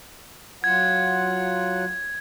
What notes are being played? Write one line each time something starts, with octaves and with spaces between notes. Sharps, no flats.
F#3 F4 F#5 G#6